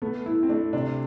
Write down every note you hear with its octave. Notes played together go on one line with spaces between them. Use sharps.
A3 B3
E4
C4
A3 D4
C3 D4